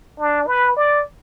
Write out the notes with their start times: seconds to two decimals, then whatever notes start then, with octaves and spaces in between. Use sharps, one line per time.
0.19 D4
0.47 B4
0.77 D5